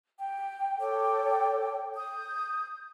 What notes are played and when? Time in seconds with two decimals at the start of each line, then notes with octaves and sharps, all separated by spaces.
0.19 G5
0.79 A4 C#5 G5 D6
1.96 D#6 G6